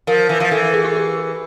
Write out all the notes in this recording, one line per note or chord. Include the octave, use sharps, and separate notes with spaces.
F3 A#4
E3
F3
E3 A4
G#4
G4
G#4